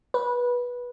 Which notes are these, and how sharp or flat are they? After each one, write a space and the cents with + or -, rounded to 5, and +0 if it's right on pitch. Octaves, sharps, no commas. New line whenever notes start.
B4 -15